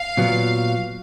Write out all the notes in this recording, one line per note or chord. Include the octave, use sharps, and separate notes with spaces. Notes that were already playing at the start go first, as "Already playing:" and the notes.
Already playing: F5
A#2 F#3 B3 F4